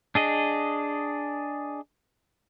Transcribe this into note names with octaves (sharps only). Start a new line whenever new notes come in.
D4 G#4 D#5